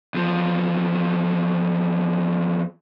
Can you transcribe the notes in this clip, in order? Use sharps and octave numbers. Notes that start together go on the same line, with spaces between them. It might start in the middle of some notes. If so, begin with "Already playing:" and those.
E2 F3